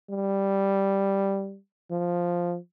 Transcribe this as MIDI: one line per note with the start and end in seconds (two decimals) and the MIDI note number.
0.10 1.57 55
1.91 2.57 53